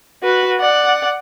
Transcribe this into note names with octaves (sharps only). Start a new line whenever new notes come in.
F#4 B4
D5 F#5